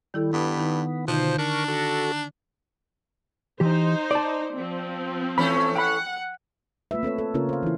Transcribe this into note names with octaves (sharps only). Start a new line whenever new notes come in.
D#3 G3 E4 A4
G2 B3
D#3 D#4
B2 D3 F3 D#4 C5
D4 A#4 C#6
F#4 A4
E3 D#4 G4 C5
D5 A5
F3 C4
E3 A3 C#4 B5
F#5 G5 B5
A3 A#3 F4 B4 E5
C4 A4 B4 C#5
A4
C#3 A#3 C#4 F4 A#4 C#5
C5 F5
E3 E4